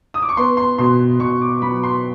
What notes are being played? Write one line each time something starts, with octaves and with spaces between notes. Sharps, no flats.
D#6
D6
C#6
B3 C6
C6
B2 C6
B2 C#6
D6
F#3 B5
C6